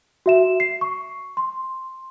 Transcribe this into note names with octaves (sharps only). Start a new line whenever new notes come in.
F#4 E5 E7
C7
C#6
C6